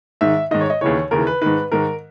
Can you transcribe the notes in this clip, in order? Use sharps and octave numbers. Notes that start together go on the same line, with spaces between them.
G#2 D#3 E5
G#2 D#3 D#5
C#5
D#5
D#2 C#3 E3 C#5
D#2 C#3 E3 A#4
B4
G#2 D#3 B4
G#2 D#3 A#4